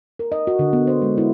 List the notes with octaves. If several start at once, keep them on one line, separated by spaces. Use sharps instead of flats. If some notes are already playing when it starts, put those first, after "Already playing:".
A#4
D#5
F#4
D3
B3
C5
G#3
E4